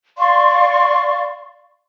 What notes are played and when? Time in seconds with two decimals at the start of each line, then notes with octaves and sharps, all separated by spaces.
0.17 D5 F5 C6 C#6